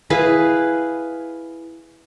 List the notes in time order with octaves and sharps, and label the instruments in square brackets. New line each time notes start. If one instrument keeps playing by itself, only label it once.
[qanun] E4 G#4 B4 F5